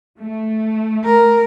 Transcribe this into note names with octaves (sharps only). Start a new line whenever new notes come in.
A3
A#4